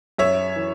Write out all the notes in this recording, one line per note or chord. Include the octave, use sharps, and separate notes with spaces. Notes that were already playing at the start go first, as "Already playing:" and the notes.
F#2 C#5 E5
E3